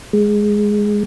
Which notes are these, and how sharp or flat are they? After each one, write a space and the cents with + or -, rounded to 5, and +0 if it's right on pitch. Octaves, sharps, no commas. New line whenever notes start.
G#3 +0